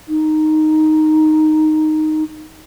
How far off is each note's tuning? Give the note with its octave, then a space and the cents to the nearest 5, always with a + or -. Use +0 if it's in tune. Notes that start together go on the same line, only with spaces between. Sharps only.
D#4 -5